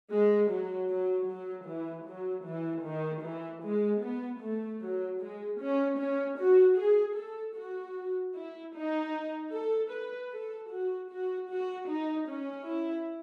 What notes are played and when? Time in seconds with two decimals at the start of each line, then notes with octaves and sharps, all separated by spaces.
0.12 G#3
0.51 F#3
0.91 F#3
1.29 F#3
1.69 E3
2.08 F#3
2.47 E3
2.86 D#3
3.25 E3
3.64 G#3
4.03 B3
4.42 A3
4.83 F#3
5.21 G#3
5.60 C#4
5.99 C#4
6.38 F#4
6.77 G#4
7.16 A4
7.56 F#4
8.34 E4
8.74 D#4
9.52 A4
9.91 B4
10.30 A4
10.69 F#4
11.09 F#4
11.48 F#4
11.87 D#4
12.25 C#4
12.66 E4